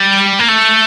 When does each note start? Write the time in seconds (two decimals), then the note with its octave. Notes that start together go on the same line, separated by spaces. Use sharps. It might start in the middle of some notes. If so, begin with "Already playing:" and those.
Already playing: G3
0.39 A#3
0.48 A3